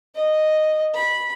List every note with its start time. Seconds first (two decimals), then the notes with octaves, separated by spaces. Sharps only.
0.16 D#5
0.94 B5